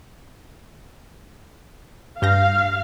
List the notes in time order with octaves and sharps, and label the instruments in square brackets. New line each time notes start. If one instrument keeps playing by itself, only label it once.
[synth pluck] G2 G6 A#6 [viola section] F5